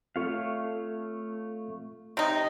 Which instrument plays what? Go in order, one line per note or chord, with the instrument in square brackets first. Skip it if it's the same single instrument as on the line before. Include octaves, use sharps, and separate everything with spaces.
[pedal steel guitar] A3 C#5 F5 [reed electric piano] C4 F4 A4
[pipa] C3 D#4 [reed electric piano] D#5